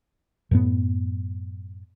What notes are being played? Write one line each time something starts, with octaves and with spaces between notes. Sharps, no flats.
F#2 A2 B3